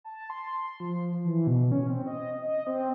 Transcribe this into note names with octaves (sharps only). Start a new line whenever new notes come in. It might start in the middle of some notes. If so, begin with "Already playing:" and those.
A5
C6
C6
F3
E3
B2
C#4
C4
D#5
D#5
C4